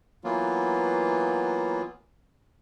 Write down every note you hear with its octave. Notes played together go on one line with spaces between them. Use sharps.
E3 F#3 A#3 B3 F4